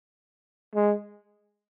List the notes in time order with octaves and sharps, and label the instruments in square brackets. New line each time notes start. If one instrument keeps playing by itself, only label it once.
[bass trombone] G#3